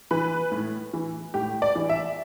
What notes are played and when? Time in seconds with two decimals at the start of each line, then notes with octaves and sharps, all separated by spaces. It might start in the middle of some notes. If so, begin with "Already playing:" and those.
0.11 E3 B4
0.52 A2
0.94 E3
1.34 A2 G4
1.62 D5
1.76 E3
1.89 E5